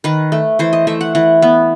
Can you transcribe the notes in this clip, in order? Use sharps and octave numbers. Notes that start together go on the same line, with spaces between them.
D#3 B4
A3
E3 C5
D#5
A3 E5
F#5
E3 F#5
B3